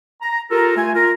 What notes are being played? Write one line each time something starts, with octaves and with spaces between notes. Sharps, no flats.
A#5
F4 G4 A4 A#4
A3 F4 G#5
F4 A#4